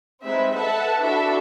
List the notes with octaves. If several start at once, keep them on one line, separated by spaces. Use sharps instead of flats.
G#3 C4 D#4 B4 E5
A4 B4 E5 F#5 A5
D4 E4 F#4 A4 E5